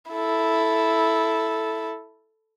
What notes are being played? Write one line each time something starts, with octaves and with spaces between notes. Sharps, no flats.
E4 A4